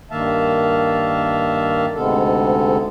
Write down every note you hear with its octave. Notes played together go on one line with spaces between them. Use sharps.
G2 D#3 A#3 E5 F5 A5
D2 G#2 C3 G#3 B3 A4